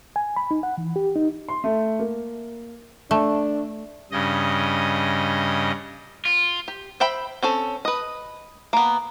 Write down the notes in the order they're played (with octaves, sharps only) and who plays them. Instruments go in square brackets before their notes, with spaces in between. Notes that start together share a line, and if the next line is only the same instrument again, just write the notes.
[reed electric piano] G#5
B5
D#4
F#5
E3
G4
D#4
[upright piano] C6
A3
A#3
[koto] A3 [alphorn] D4
[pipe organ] G2 C#3 D#5
[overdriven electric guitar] F4
[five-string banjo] G4
C5 E5 G5 B5
C4 C#4 A4
B4 D#5
A#3 B3